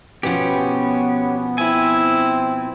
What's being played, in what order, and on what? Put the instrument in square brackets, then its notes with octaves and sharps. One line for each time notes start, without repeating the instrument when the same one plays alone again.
[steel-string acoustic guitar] B2 F3 [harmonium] B3 [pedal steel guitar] C#4 G4
[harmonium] C4 [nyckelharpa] E4 [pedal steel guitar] G#5